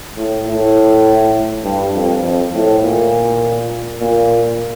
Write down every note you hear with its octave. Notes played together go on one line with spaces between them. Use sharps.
A2
A2
G2
F2
F2
A2
A#2
A#2